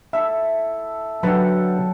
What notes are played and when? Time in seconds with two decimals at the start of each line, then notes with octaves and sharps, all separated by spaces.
0.13 E4 A4 E5
1.23 D3 F#3 A4 B4 F#5 G5 A5